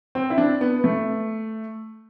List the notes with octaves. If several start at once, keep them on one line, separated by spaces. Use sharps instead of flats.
C4
E4
D4
B3
A3